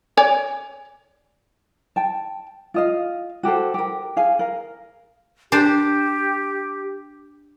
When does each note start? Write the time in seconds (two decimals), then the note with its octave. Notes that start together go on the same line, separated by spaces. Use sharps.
0.17 C#5 D5 G#5
1.96 G5 A5
2.74 F4 D#5 F5
3.43 F#4 G4 A4 C5
3.74 G4 A#4
4.17 G#4 F5 G#5
4.39 A#4 F5
5.52 D4 G4 C5